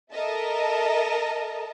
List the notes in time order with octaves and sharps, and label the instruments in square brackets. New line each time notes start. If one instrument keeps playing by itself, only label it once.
[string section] A4 A#4 D#5 E5 A5